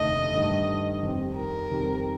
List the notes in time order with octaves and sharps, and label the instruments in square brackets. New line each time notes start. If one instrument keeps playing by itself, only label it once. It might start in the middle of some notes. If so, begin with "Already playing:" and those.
Already playing: [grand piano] F1 D#2 D3 A3 [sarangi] D#5
[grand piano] G2 D#3 A3
F2 D#3 G3 C4 G4
[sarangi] A#4
[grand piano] F2 D#3 G3 C4 G4